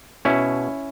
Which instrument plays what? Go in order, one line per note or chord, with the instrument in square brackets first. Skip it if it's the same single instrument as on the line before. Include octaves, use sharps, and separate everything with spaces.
[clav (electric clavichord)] B2 C#4 E4